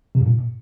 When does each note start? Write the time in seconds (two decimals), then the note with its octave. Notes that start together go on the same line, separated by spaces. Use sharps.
0.15 C3
0.20 G2
0.26 A#2